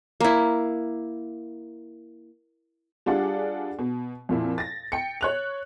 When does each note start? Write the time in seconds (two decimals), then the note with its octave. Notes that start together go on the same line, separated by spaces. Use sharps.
0.20 A#3 E4
3.06 G3 D4 F4 G#4 D5 F#5
3.79 B2
4.29 F2 A#2 E4
4.58 A6 A#6
4.92 G5 C#7
5.21 C#5 F#6 F7